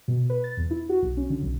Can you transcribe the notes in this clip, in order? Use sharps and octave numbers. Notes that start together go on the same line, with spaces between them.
B2
B4
A6
E2
E4
F#4
B1
C#4
D3
B1